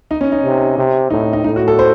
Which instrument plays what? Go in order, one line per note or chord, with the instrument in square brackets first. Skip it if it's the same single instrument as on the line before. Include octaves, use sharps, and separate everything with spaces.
[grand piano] D#4
C#4
D#4
[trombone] C3
C3
[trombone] A2 [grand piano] D#4
[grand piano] D#4
[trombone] A2 [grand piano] D#4
[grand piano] F#4
A4
C5